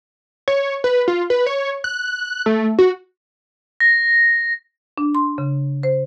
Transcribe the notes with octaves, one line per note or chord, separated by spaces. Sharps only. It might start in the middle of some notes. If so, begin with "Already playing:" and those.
C#5
B4
F4
B4
C#5
F#6
A3
F#4
A#6
D4
C6
C#3
C5